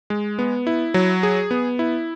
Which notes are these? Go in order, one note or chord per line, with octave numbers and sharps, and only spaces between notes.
G#3
B3
E4
F#3
G#4
B3
E4